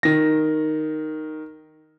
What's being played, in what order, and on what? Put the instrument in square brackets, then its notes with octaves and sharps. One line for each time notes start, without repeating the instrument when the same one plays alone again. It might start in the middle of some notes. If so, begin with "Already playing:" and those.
[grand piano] D#3 A#6